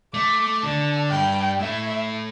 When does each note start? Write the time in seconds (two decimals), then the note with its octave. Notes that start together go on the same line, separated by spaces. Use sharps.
0.14 A3 D6
0.62 D3 A5
1.11 G2 G5
1.59 A2 E5